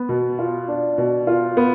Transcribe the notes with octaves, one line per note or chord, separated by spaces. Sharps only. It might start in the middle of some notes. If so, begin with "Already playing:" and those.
Already playing: B3
B2
F4
D4
B2
F4
B3